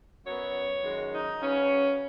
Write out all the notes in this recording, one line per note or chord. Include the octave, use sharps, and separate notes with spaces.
F#2 F#3 B3 C#5
F#2 D#3 G#3
D#4
C#3 F#3 B3 C#4